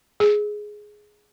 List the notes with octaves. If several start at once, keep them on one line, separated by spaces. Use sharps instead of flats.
G#4